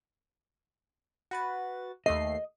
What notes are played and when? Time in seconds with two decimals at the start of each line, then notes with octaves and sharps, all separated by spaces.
1.31 F#4 B4 A6
2.06 D#2 A3 D#5 C7